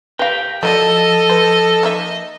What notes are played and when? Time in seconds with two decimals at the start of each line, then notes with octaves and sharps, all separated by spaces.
0.19 G4 A#4 B4 F5 G5
0.63 F3 F#3 A4 A#4 D5 D#5
1.30 B4 C5
1.83 A#3 D#4 E5